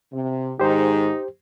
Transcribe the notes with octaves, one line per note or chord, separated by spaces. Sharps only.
C3
G#2 D#3 D#4 G4 C5